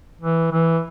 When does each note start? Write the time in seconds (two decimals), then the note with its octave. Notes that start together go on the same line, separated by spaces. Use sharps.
0.21 E3
0.52 E3